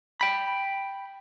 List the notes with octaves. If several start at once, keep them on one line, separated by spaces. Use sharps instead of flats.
G5 B5